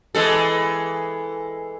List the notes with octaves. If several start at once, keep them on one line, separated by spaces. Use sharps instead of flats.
E3 G#3 A4